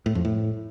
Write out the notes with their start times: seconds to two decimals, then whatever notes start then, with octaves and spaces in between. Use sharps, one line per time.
0.06 A2
0.15 F2
0.25 A2